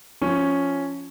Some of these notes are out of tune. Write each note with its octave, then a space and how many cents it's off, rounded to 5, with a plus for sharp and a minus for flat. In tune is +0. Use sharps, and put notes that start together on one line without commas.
F3 +0 C#4 +0